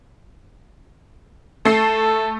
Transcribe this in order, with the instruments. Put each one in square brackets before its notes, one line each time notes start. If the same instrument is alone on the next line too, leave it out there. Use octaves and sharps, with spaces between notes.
[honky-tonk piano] A3 C7 [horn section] A4